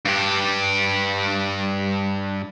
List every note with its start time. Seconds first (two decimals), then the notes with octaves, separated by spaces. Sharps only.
0.05 G2 G4